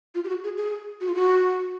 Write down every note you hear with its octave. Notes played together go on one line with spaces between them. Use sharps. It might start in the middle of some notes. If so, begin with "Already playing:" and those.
F4
G4
F#4
G#4
G#4
F#4
F4
F#4